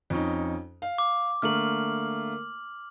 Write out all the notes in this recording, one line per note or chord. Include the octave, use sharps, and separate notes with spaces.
F2 C#4 D#4
F5
D6
D3 A3 A#3 F6 F#7